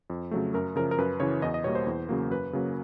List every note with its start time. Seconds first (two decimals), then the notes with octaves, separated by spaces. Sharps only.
0.10 F2
0.31 C#3 F#3 A3
0.54 F#2 A#4
0.76 C#3 F3 A#4
0.91 A#4
0.98 F#2 B4
1.20 C#3 E3 C#5
1.42 E2 D#5
1.54 D#5
1.64 B2 G3 A#3 C#5
1.75 C5
1.87 E2
2.09 C#3 F#3 A#3
2.31 F#2 B4
2.53 C#3 F#3 A#3